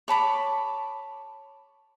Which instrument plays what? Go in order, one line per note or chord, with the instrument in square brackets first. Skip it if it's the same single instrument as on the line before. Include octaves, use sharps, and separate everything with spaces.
[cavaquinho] C#5 A5 B5 D6